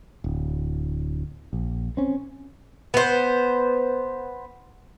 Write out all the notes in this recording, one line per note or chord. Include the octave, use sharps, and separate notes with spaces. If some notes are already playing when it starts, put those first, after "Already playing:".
D1
A#1
C4 C#4
B3 C5